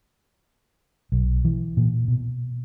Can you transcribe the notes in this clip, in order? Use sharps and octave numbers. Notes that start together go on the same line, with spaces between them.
B1
E3
A#2
B2